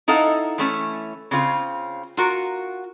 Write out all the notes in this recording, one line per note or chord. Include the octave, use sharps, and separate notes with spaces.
D#4 E4 A4 D#5 F5 F#5
E3 A3 C#4
C#3 C4 F4
F4 F#4 A#4